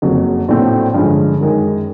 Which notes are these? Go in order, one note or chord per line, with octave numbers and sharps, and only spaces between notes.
F#1 F2 C#3 F#3
A#1 A2 F#3 A3 C4
G2 D3 F3 G#3 C#4
F#2 D#3 G#3